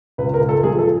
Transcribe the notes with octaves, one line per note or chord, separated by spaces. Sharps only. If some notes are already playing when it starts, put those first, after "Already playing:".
C#2 B4
A#4
C#2
A4
F3 G#4
A4